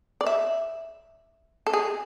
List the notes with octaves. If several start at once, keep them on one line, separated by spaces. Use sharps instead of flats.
D5
E5
A4
G#4